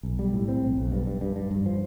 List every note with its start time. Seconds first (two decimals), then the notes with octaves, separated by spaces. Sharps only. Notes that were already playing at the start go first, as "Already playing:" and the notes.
0.03 B1
0.19 G3
0.33 A2
0.48 C4
0.63 B1
0.77 B1
0.91 G2
1.06 G2
1.21 G2
1.36 G2
1.51 G2
1.66 F3